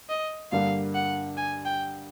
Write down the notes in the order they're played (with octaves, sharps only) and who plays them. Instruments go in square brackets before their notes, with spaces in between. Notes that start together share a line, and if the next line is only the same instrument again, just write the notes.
[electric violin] D#5
[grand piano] G2 D3 G3 A#3 [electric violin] F5
[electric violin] F#5
G#5
G5